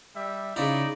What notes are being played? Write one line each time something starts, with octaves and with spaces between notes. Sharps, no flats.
G3 E5
C#3 D#4 E4 D5